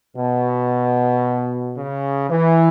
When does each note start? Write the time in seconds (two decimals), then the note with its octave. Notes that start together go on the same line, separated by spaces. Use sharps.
0.16 B2
1.78 C#3
2.31 E3